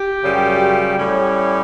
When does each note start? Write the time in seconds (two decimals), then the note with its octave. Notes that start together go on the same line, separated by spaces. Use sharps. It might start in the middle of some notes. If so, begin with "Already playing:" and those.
Already playing: G4
0.23 F#2 C#3 G3
0.97 A2 G3 C#4